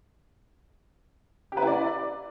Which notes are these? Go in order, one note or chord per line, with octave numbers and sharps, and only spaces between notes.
G4
B4
E4
D5